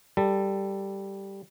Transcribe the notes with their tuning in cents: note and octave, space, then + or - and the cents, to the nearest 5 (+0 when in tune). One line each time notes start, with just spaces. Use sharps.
G3 +0 A4 +15